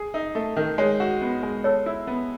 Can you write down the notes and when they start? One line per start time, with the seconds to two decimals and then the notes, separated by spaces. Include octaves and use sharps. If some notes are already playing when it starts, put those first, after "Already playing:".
Already playing: G#4
0.14 D#4
0.35 A3
0.56 D#3
0.78 G#3 C#5
1.00 F#4
1.21 B3
1.43 G#3
1.64 A4 C#5
1.86 E4
2.07 B3